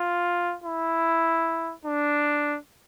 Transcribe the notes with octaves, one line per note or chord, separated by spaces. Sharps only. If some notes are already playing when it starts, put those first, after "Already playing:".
Already playing: F4
E4
D4